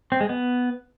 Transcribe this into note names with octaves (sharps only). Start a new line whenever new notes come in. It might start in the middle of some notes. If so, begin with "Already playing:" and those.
C4
G#3
B3